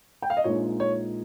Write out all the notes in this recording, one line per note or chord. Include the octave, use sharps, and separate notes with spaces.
G5
F5
D#5
A#1 A#2 G#3 D#4 C#5
C#5